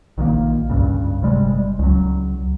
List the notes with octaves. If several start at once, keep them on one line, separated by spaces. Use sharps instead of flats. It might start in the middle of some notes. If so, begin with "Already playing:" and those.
A#1 D#3 E3 A#3
C#2 G2 C#3
G1 C3 G3 G#3
C#2 F#3